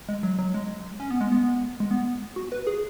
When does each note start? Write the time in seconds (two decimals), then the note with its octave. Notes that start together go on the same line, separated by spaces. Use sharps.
0.09 G#3
0.23 F#3
0.39 F#3
0.54 G#3
1.00 C#4
1.11 B3
1.21 G#3
1.32 B3
1.80 G#3
1.91 B3
2.36 F#4
2.52 B4
2.67 G#4